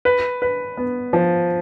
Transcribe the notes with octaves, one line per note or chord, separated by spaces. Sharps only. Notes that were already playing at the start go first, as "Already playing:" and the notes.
B4
B4
B3
F3